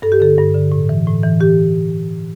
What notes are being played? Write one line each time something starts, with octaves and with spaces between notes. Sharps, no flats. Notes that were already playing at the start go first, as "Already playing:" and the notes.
G2 A4
G4
D3 A4
G2
D3
A2
E3
A2
E3
E3 G4